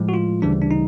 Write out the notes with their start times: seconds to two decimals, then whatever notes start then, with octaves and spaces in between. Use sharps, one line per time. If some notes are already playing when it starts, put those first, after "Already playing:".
Already playing: A2 F3 G#3
0.09 F#4
0.14 F4
0.42 D2 C#3 E3 G3 D4
0.62 D4
0.71 D#4